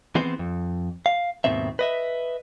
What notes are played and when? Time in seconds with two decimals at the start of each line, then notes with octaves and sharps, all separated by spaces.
0.15 E3 B3 C4 G#4 C5
0.39 F2
1.06 F5
1.44 D#2 G#2 B2 D#3 C4 E5
1.79 B4 D#5 E5